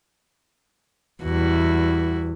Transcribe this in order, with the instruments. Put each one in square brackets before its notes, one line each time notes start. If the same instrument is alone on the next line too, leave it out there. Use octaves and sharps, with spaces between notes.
[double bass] E2 [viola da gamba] G3 E4 F#4